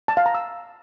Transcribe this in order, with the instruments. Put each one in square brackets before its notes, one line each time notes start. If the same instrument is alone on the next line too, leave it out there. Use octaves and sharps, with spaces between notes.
[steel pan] A5
F5
A#5
E6